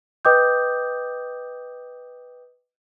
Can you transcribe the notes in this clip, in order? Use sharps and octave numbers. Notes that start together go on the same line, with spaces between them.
B4 D#5 G5 D6 D#6 G6